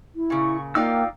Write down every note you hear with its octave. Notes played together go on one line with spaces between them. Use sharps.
E4
A#2 C#3 C#6
A#3 D#4 F4 D5 F5 G5 E6